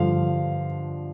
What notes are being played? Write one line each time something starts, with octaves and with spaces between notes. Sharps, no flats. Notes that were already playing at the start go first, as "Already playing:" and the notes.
Already playing: G2 D3 F3 F5